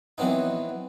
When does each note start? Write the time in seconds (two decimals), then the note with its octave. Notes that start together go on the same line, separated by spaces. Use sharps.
0.18 E3 F#3 B3 C4 D#4